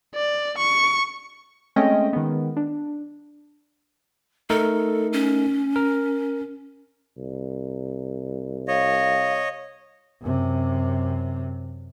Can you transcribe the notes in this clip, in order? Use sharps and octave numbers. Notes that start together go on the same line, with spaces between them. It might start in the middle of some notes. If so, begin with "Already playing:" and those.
D5
C#6
G#3 A3 C4 C#4 D#5 G5
D#3 G#3 B3
D4
A3 D#4 A4 A#4
C#4
A#4
C2
C#5 D#5 F5
F#2 C3